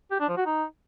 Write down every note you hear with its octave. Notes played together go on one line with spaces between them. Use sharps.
G4
D4
F3
F#4
D#4